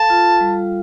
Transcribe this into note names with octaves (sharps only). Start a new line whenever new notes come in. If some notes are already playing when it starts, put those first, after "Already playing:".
Already playing: A4 F5 A5
F4
G3